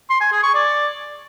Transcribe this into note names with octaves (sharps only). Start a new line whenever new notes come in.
C6
G#5
G#4
C#6
D5